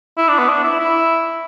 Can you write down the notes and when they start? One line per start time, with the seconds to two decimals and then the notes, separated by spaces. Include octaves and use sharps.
0.18 E4
0.28 D4
0.39 B3
0.49 D4
0.64 E4
0.79 E4